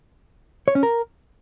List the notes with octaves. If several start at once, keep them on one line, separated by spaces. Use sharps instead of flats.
C#5
C#4
A#4